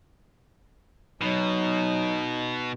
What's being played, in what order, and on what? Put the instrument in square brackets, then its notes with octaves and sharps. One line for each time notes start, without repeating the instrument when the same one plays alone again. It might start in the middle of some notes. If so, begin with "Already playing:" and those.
[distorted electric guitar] B2 [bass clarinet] F#3 [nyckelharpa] D#4